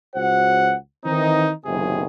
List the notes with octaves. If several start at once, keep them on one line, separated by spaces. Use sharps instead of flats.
C#2 F#4 C5 F#5
D#3 E3 C4 D#4
F#1 B1 C3 D#3 G#4